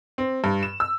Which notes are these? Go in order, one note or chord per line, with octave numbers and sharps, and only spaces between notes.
C4
G2
E7
E6